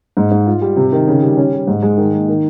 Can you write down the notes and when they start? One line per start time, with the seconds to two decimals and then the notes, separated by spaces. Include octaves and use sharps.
0.17 G#2
0.31 G#2
0.47 F4
0.62 G3
0.76 C3
0.92 D#3
1.07 C#3
1.23 G3
1.37 C#4
1.53 G3
1.67 G#2
1.83 G#3
1.97 D#3
2.13 A#3
2.28 D#3